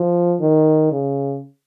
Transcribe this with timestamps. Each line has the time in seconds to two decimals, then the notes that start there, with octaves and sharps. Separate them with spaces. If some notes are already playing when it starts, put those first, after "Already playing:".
Already playing: F3
0.40 D#3
0.92 C#3